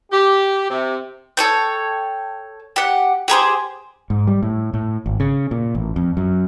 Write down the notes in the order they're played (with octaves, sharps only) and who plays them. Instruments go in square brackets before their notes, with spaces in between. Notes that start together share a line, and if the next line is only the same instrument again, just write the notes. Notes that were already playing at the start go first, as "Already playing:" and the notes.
[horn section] G4
C3
[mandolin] A4 C#5 G5
G4 F#5
G4 G#4 A#4 C5
[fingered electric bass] G#2
G3
A2
A2
G#1
C#3
A#2
A1
F2
F#2